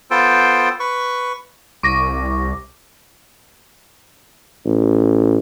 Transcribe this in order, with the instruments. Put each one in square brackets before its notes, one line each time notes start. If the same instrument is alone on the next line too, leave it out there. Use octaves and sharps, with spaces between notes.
[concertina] B3 F4 A4 C5 G5
B4 C#6
[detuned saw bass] C2 [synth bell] C#6 D6 A#6
[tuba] A1